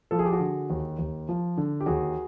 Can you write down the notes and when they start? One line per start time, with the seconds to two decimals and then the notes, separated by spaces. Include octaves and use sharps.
0.11 F3 A4
0.19 G#4
0.26 G4
0.33 F#4 G#4
0.40 D3
0.70 D#2
0.99 D#2
1.29 F3
1.58 D3
1.80 G4
1.86 D#2 F#4 G#4